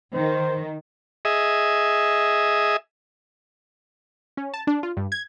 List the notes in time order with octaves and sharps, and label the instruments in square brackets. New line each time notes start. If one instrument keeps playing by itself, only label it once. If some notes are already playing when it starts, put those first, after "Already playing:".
[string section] D#3 [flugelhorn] C5
[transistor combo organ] G#4 D#5 E5
[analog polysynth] C#4
A5
D4
F4
G2
G#6